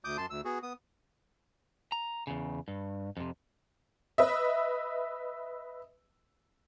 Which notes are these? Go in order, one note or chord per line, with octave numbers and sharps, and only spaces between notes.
D2 D6 D#6 G6
F#2 A5 C6
D2 E6
B3 F#4 G#4
B3 D#6
A#5
E2 C#3
G2
F2 C3
B4 D#5 E5